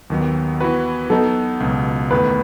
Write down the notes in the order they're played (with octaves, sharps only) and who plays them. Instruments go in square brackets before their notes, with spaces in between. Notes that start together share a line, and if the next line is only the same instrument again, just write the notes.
[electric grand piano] D#2 D#3 F#3 B3
E3 B3 F#4 B4
[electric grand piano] F#3 B3 D#4 [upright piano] A4
[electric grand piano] C#2 B2 F#3
[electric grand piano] E2 D#3 A3 [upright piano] B4